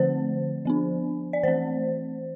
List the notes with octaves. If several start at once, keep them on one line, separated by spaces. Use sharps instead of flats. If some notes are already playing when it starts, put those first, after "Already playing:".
Already playing: D3 F3 A3 C4 C5
F3 B3 D4
D5
E3 A3 C4 C5